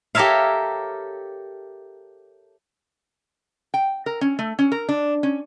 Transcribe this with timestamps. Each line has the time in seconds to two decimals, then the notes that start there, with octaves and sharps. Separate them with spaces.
0.15 G4 A4 A#4 C#5 E5 F5
3.74 G5
4.06 A#4
4.21 C#4
4.39 A3
4.59 C#4
4.72 A#4
4.89 D4
5.23 C#4